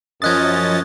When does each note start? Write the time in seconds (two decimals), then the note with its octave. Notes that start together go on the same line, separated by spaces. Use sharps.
0.22 F#2 F3 C#4 D#5 D#6 F#6 G#6 A6